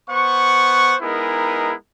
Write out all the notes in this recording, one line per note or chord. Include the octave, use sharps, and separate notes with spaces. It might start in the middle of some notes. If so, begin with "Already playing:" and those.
B3 C5 F#5 C#6
G#3 B3 D#4 E4 G#4 A#4